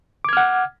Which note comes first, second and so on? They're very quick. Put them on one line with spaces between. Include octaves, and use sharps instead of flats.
D6 G#6 F6 F#5